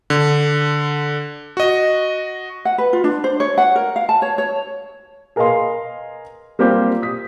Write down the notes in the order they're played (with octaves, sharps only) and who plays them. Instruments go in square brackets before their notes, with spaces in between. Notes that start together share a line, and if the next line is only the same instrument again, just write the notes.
[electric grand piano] D3
F#4 D#5
[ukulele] F#5
B4
F4
D4
C5
C#5
F#5
A#4
F5
A5
C#5
C#5
[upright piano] G#4 A#4 B4 D#5 F5 C6
G3 A#3 C4 F4 G4 C5
D#6 B6